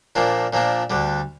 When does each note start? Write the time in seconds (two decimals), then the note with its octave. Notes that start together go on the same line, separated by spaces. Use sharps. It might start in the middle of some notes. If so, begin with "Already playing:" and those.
0.15 A#2 F3 A#3 D4
0.53 A#2 F3 A#3 D4
0.90 D2 D3 G3